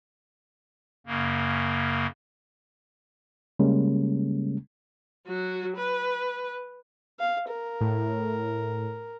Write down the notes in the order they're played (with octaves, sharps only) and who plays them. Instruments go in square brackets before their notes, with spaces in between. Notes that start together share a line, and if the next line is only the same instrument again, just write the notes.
[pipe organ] F#2 C#3 A#3
[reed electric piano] C#3 G3 G#3 A#3 C#4
[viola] F#3 F#4
B4
[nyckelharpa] F5
A#4
[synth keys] A2